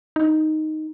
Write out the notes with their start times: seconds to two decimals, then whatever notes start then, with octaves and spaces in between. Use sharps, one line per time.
0.16 D#4